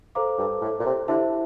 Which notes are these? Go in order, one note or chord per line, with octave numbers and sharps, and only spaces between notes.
A4 C5 F5 A#5 D6
G2
A2
A#2
C3
D3 E4 G4 C5 E5 A5